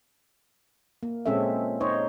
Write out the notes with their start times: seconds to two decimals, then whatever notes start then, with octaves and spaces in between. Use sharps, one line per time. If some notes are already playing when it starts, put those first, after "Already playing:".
1.03 A#3
1.26 A#2 G#3 C4 C#4 A4 E5
1.81 D#4 C5 C#5 D#5